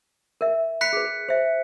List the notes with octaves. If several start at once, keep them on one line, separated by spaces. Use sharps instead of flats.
A#4 E5
B5 F#6 B6 C#7
G#4 B4
C5 E5